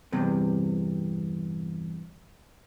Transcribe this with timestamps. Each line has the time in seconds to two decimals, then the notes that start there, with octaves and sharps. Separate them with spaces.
0.12 E2 G2 C3